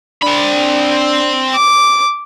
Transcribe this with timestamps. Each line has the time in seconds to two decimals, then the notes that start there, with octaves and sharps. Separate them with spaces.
0.23 C4 D4 B5
1.53 D6